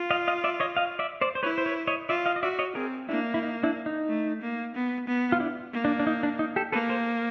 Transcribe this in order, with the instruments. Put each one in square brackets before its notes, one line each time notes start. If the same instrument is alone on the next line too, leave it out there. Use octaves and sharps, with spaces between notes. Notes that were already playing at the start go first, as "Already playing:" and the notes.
Already playing: [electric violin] F4
[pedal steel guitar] D#5 F5
D#5 F5
D5 E5
C#5 D#5
D#5 F5
D5 E5
C5 D5
C5
[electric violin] E4 [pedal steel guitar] B4 C#5
[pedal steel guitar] C5
B4 C#5
C#5 D#5
[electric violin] F4 [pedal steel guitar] D5 E5
[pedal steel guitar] D#5 F5
D#5
[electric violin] F#4 [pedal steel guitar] D5 E5
[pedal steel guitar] C#5 D#5
[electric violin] C4 [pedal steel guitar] G#4 A#4
[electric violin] A#3 [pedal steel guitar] D4 E4
[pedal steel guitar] E4
D#4
D4 E4
D#4
[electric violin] A3
A#3
B3
B3
[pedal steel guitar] F4
D4 E4
[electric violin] A#3
[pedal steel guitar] D4
D4
D#4
D4
D#4
G4 A4
[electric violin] A#3 [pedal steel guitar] A4 B4
[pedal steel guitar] A#4 C5